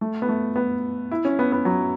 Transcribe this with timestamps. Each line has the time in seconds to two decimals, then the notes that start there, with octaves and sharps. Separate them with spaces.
0.01 A3
0.22 B3
0.29 A3
0.56 B3
1.11 E4
1.25 C#4
1.39 B3
1.52 B3
1.65 F#3